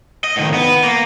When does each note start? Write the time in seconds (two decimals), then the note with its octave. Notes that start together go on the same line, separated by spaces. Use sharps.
0.24 D#5
0.36 A2 D#3
0.54 B3
0.84 A#3